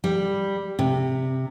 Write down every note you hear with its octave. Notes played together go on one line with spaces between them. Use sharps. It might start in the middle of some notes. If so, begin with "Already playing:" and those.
G3
C3